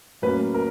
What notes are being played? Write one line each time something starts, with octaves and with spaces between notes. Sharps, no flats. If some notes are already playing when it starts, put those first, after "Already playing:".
A2 F#3 A#3 C#4 B4
A#4